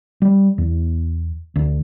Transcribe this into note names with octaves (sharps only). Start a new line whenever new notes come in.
G3
E2
D2